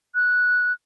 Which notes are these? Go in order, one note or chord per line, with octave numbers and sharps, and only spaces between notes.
F#6